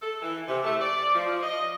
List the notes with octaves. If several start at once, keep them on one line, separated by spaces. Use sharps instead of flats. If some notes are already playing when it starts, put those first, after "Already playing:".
A4
E3
C3
A3
D5
F3
D#5